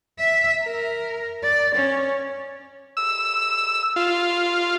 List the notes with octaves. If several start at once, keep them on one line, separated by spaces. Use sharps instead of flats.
E5
A#4
D5
C#4
E6
F4